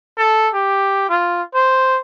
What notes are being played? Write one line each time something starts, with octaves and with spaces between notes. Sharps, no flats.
A4
G4
F4
C5